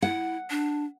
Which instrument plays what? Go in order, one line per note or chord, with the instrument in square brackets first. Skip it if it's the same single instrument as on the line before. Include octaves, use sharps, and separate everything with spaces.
[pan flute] E4 [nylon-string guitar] F#5
[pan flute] D4